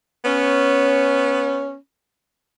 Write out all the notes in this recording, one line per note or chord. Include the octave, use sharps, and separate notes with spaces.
B3 C#4